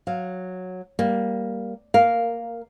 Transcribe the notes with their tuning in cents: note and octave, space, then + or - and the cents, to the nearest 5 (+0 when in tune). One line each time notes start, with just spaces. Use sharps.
F#3 -10 F5 +0
G3 -5 A#3 +0
A#3 -10 A#4 +0 F5 +0